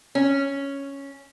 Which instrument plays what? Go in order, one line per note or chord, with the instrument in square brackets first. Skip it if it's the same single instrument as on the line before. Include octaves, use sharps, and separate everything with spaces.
[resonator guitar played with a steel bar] C#4